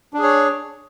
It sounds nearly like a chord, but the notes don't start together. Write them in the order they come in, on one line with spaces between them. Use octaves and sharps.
D4 G#4 C#5